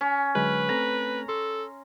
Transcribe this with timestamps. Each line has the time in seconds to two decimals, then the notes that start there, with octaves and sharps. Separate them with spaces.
0.01 C#4
0.35 D3 F#3 G#3 B4
0.69 A3 C4 A4 A#5
1.28 A4 C6